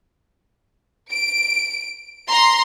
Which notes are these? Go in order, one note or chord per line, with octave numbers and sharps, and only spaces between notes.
D7
A#5 C6